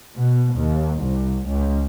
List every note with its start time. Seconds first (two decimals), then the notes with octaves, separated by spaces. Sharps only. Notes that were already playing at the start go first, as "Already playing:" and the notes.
0.17 B2
0.58 D#2
0.98 C2
1.49 C#2